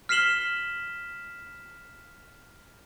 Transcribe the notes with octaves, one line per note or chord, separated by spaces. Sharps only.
F6 B6 C7 E7 F#7 G7